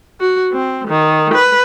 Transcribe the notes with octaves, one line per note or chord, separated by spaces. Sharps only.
F#4
C4
D#3
B4